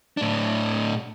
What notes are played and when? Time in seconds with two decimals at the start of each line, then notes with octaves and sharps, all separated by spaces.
0.17 A2 D4